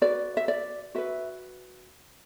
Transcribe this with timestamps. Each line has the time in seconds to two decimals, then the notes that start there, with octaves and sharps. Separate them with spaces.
0.02 F#4 B4 D5
0.37 E5
0.48 D5
0.95 F#4 B4 E5